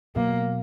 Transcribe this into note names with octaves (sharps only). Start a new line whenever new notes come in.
B2 F#3 A#3 B3